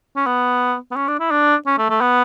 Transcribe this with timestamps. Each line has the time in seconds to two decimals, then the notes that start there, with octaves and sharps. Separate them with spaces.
0.16 C#4
0.26 B3
0.91 B3
0.96 C#4
1.08 D4
1.19 E4
1.31 D4
1.66 C#4
1.79 A3
1.90 A3
2.01 B3